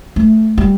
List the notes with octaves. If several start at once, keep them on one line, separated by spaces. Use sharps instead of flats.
A3
G3